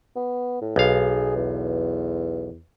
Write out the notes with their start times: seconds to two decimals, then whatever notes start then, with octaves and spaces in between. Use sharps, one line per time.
0.16 B3
0.62 A2
0.76 B1 G#4 F5
1.36 E2